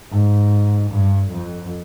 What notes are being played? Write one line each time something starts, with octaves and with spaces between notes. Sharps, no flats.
G#2
G2
F2